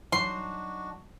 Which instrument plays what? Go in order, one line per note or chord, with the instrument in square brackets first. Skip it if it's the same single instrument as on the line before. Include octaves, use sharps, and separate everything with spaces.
[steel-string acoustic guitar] F#3 D#4 [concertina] D4 F#4 [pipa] C6